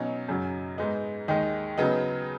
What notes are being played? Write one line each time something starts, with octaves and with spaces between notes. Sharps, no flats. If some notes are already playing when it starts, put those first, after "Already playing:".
Already playing: B2 F#3 C#4 D#4
F#2 C#3 F#3 C#4
G#2 G#3 B3 D#4
D#2 D#3 G#3 D#4
C#3 F#3 B3 D#4